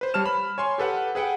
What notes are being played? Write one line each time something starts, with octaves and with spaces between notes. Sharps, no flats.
B4 C5
G3 C#5 A5 F6 E7
B5
C#5 G#5 C6
G4 A4 B4 F#5
G#4 B4 F#5 G5